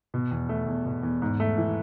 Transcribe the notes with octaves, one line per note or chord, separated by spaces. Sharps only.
B2
E2
A3
E2
B2
E2
G#2
A3
E3